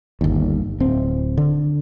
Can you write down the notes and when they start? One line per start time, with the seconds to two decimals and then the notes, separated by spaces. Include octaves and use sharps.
0.21 G1 D#2
0.80 D1 C4
1.38 D3